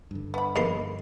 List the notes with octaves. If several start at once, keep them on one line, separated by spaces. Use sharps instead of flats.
G2 D3
B3 B5
D#2 A#3 B4 C6